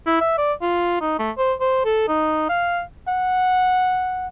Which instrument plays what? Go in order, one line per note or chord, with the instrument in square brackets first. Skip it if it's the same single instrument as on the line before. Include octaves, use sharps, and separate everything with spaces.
[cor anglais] E4
E5
D5
F4
D#4
A3
C5
C5
A4
D#4
F5
[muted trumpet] F#5